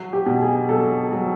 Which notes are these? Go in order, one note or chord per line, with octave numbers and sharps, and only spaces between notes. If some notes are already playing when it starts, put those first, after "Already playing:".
Already playing: F#3
G4
B2
G#4
F#3 A4
F#3